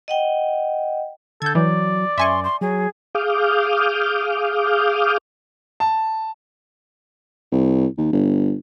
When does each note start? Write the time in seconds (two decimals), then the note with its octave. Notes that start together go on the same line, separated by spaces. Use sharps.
0.08 D#5 F#5 G5
1.42 D3 A4 G6 G#6
1.55 E3 F#3 D5
2.18 F#2 E5 G#5 C6 C#6
2.44 C6
2.61 F#3 G#4
3.15 G#4 F5 D6 D#6 F6 G6
5.80 A5
7.52 C2
7.98 D#2
8.12 G1